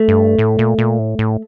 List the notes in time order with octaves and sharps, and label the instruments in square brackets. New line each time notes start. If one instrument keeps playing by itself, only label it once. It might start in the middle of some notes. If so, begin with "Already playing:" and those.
Already playing: [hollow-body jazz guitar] A3
[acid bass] G2
A2
A#2
A#2
A2
A2